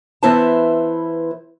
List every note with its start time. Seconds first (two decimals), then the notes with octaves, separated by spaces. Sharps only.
0.23 E3 B3 E4 B4 C5 A5